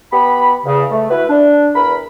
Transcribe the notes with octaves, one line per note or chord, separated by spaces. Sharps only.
B3 G4 B5
E2 C#3
A3
E4 F#4 B4
D4
E2 A#4 B5